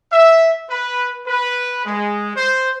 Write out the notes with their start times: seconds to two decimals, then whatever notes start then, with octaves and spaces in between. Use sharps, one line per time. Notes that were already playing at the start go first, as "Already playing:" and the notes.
0.11 E5
0.70 B4
1.26 B4
1.85 G#3
2.36 C5